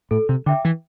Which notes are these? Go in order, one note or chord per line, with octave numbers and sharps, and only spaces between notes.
A2 A4
C3
D3 E5 G5 D6
E3